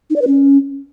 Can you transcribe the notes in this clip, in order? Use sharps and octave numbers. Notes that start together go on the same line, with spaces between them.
D#4
D5
B4
C#4